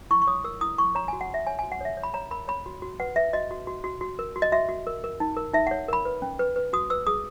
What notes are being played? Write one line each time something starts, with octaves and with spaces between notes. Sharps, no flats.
E4 C#6
C#6
C#5 D#6
A#4 E6
E4 D#6
E4 C#6
C#5 A#5
G#5
F#4
F#5
F#4 E5
C#5 G#5
G#5
F#4
F#5
C#5 E5
C#5
B5
C#5 A#5
A#4 B5
C#5 B5
F#4
F#4
B4 F#5
B4 E5
F#4 D#5
F#4
F#4
F#4
F#4
A#4
F#4
D#5
F#4 E5
F#4
A#4
A#4
D#4
A#4
D#4 E5
F#5
C#5
A#4 B5
B4
C#4
B4
B4
F#4 D#6
B4 E6
G#4 D#6